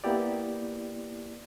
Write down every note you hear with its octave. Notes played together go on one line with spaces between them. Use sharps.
A#3 B3 E4 G4 D5